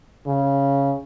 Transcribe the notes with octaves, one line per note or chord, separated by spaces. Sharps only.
C#3